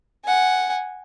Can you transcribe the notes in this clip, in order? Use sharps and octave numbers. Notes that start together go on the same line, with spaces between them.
F#5 G#5